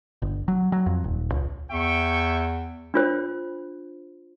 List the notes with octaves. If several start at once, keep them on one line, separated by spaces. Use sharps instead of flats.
G1
F#3
F#3
F2
D#1
C#2
E2 E5 G5 C#6
D4 F4 C5